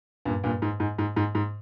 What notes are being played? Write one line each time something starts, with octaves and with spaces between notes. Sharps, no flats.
G2 A#2
G2 A#2
G#2
G#2
G#2
G#2
G#2